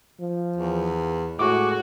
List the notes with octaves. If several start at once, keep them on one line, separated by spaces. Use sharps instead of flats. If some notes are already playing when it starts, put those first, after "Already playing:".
F3
E2
A2 G#3 F#4 C#6 D6